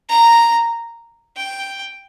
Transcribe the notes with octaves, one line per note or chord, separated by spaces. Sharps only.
A#5
G5